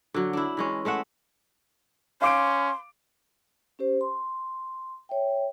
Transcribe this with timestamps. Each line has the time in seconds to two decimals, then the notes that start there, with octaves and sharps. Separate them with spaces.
0.14 D3 F#3
0.33 D4 E4
0.57 E3 G#3 C#4
0.85 G#3 A3 E5 F#5
2.22 C#4 F5 C6 D6 D7
3.79 C#4 G4 C5
4.01 C6
5.09 C#5 E5 G5